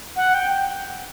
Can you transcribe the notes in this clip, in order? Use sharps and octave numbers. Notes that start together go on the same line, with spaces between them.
F#5
G5